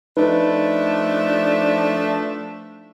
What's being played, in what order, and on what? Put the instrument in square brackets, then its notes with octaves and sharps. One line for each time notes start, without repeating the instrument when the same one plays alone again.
[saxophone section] F3 A3 D4 [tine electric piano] D#4 B4